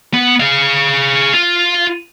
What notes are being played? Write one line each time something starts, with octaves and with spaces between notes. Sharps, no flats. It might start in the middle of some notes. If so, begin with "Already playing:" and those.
B3
G#4 F5
F4